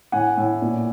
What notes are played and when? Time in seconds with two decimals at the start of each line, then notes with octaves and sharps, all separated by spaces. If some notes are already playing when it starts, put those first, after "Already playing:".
0.12 A2 F#5 G#5
0.37 A2
0.62 A#2